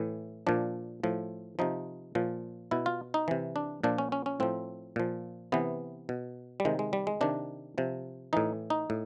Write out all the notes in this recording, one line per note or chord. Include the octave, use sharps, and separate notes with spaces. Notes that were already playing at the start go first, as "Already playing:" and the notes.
Already playing: A2 E3
A#2 F3 D4
A2 F3
C3 F3 D#4
A#2 F3
B2 E4
F4
D#4
C3 E3
D4
A#2 F3 D4
C#4
C#4
C#4
A2 F3 C4
A#2 F3
C3 E3 B3
B2
G3
C3 D#3 G#3
G#3
G3
G#3
C3 D#3 D4
C3 F3
A2 E3 D#4
D#4
A2